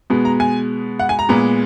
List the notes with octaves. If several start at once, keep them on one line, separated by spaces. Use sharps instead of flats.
B2 G#3 B3
A#5
G#5
F#5
G#5
A#5
A#2 G#3 B3